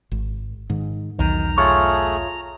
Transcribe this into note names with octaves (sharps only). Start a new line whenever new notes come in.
G#1
G#2 D#3
B1 E2 D#3 A#5
A3 F4 G#4 C#5